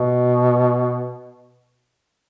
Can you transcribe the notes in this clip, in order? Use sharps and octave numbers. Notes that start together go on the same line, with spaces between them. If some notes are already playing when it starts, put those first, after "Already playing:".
Already playing: B2